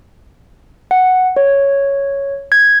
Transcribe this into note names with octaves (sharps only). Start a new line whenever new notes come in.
F#5
C#5
G#6